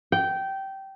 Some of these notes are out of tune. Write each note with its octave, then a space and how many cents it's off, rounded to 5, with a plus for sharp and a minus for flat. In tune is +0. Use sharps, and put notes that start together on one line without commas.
G5 -15